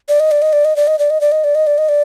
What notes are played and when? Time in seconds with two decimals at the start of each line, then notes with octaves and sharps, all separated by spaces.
0.09 D5
0.20 D#5
0.31 D5
0.42 D#5
0.53 D5
0.65 D#5
0.76 D5
0.87 D#5
0.99 D5
1.10 D#5
1.21 D5
1.32 D#5
1.44 D5
1.55 D#5
1.67 D5
1.78 D#5
1.89 D5